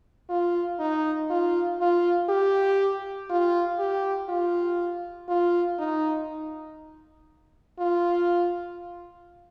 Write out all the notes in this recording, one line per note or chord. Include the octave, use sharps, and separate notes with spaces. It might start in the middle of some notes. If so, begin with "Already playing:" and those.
F4
D#4
F4
F4
G4
F4
G4
F4
F4
D#4
F4